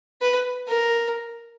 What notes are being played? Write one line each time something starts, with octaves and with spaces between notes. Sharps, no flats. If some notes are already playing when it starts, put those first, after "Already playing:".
B4
A#4